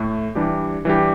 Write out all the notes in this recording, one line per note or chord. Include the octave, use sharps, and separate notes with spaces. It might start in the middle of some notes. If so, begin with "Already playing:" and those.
Already playing: A2 A3
E3 G3 D4 G4
E3 G3 D4 G4